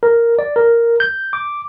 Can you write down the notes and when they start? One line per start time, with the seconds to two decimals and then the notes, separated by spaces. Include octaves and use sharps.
0.03 A#4
0.39 D5
0.56 A#4
1.00 G6
1.33 D6